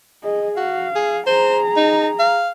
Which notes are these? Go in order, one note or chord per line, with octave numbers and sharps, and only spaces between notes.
G#4 D#5
F#4 F5
G#4
G#4 C5 A#5
D#4
F5